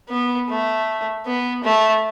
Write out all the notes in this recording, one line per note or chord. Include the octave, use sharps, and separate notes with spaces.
B3
A3
B3
A3